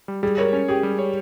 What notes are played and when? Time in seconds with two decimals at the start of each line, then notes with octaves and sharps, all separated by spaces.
0.08 G3
0.23 G3 G#4
0.38 A#4 C#5
0.53 C#4
0.68 G4 G#4
0.83 G3
0.99 C#5